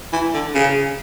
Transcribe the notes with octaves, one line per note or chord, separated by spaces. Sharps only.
E3
D3
C#3